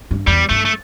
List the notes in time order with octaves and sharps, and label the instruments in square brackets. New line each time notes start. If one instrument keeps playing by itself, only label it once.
[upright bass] G2
[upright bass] E2 [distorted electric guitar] G3
[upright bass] G2 [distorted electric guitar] A3
[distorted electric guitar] A3